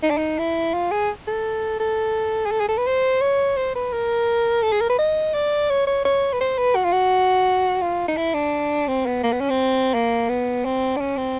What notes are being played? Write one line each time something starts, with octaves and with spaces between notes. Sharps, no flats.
D#4
D4
D#4
E4
F4
G#4
A4
A4
G#4
A4
G#4
A4
B4
C5
C#5
C5
B4
A#4
A4
G#4
A#4
B4
D#5
D5
C#5
C#5
C#5
B4
C5
B4
F#4
F4
F#4
F4
D#4
E4
D4
C4
B3
A#3
B3
C#4
C4
A#3
B3
C4
D4
C#4
C4